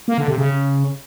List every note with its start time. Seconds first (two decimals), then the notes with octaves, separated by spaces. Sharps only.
0.08 A#3
0.18 D3
0.28 C3
0.38 C#3